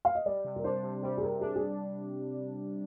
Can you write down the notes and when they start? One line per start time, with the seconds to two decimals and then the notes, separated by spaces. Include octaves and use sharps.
0.05 F5
0.15 D#5
0.26 G3 D5
0.45 C3
0.56 A#4
0.64 D4 C5
0.83 C3
1.03 G3 C5
1.17 G#4
1.22 C3 A#4
1.41 D4 G#4
1.56 G#4